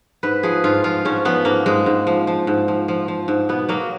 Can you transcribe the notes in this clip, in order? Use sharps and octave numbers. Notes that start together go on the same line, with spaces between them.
G#2 B4
F3 G#4
G#2 F4
F3 F4
G#2 C#4
F3 B3
G#2 A#3
G#2 G#3
G#2
F3
F3
G#2
F3
F3
F3
G#2
B2 B3
F#3 A#3